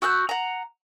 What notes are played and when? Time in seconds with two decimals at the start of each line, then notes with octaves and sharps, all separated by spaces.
0.02 F#4 E6 F#6 G6
0.29 F#5 A#5